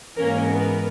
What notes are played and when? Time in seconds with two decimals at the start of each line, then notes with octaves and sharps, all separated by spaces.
0.16 G#2 E3 A#3 C#4 A#4
0.47 B3 A#4